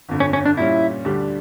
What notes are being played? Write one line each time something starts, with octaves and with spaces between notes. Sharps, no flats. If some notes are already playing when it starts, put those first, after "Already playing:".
G1 F2 D3
C#4
C#4
D4
A#2 G3 C#4 E4
D2 D3 G3 D4 G4